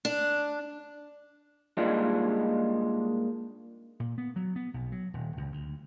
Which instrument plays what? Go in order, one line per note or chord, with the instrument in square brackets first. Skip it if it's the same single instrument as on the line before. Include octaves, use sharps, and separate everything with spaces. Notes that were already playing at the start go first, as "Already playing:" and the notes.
[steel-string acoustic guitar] D4
[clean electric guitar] A#2 G3 G#3 D4 D#4 F4
[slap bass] A#2
B3
F#3
B3
B1
F#3
D#1
C#2
D2